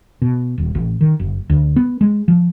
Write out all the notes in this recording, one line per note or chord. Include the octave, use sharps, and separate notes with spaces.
B2
D#1
A1
D#3
F#1
D2
B3
G#3
F3